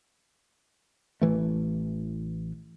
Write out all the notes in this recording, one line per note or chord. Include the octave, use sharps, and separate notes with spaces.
A1 E3 A3